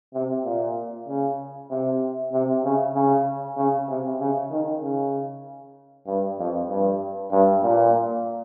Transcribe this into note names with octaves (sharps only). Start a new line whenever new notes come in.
C3
A#2
C#3
C3
C3
C#3
C#3
C#3
C3
C#3
D#3
C#3
G2
F2
G2
G2
A#2